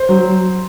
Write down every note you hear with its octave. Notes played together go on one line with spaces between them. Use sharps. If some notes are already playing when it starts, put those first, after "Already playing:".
Already playing: C5
F#3